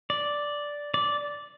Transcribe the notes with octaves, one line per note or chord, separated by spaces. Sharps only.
D5
D5